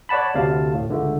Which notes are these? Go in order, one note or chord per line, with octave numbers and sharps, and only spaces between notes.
C#5 D5 F#5 A5 B5
D2 C3 F5 A5
A2
C#2 D3 A3